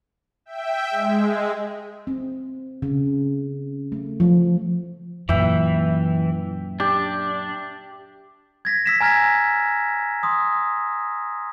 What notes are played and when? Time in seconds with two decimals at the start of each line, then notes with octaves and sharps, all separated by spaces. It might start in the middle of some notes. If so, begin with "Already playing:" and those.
0.46 E5 G5
0.91 G#3
2.07 C4
2.82 C#3
3.92 A3
4.20 F3
5.29 F#2 A#2 E3 E5 G5
6.80 D4 G4
8.65 G#6 A#6 B6
8.86 E6 B6 E7
9.00 G#5 A#5 F6 G#6 A#6
10.23 C6 D#6